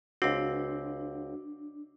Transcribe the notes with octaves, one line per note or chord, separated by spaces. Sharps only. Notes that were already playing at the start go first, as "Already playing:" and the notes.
C#2 C4 D4 F#4